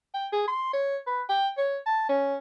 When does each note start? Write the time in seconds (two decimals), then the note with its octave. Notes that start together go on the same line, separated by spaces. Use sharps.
0.14 G5
0.32 G#4
0.48 C6
0.73 C#5
1.07 B4
1.29 G5
1.58 C#5
1.86 A5
2.09 C#4